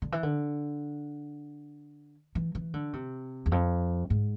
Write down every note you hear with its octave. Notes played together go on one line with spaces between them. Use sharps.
D3
E3
D3
E3
E3
D3
C3
E2
F2
G#2